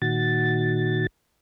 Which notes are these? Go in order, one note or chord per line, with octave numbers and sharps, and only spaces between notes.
A#2 D#3 F#4 A6